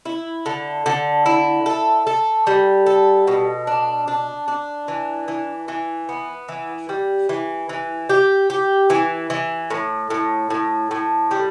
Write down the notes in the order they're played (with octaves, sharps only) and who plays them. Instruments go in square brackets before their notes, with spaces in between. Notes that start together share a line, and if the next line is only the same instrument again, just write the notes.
[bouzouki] E4
D3
D3
E4
A4
A4
G3
A4
B2
D4
D4
D4
E3
E3
E3
B3
E3
G3
E3
E3
G4
G4
E3
E3
A2
A2
A2
A2
G3